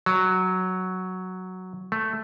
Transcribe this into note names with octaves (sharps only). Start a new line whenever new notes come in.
F#3
A3